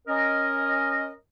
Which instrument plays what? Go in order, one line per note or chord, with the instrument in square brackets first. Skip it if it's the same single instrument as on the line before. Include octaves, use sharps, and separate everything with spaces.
[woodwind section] C#4 A#4 D#5